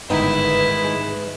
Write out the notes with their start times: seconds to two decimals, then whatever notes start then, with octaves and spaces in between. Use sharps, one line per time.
0.10 G1 G#2 D#3 D#4 E4 B4 G5
0.84 G#3